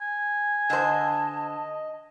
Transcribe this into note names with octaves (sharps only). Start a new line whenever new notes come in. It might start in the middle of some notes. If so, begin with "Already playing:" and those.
G#5
D3 C5 D#5 A5